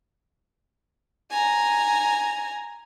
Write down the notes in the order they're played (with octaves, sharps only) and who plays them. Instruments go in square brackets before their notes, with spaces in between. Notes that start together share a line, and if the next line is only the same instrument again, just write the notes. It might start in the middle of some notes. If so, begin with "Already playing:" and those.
[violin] G#5 A#5